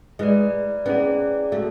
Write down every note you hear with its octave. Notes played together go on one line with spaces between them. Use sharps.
G#3 E4 B4 D5
B3 C#4 E4 G#4 D5
A3 F#4 A4